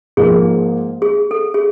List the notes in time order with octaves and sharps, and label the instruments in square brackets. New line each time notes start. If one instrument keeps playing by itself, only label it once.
[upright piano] G#2 F3 A#3 D#4 [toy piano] G#4
[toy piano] G#4
A4
G#4